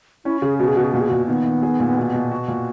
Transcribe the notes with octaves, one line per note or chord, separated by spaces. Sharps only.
C#4 E4
C#3 G#4
B2 F#4
G#4
B2 F#4
G#4
A#2 F#4
G#4
A#2 F#4
D#3 B3
D#3
G#4
A#2
B2
B2
F#4
A#2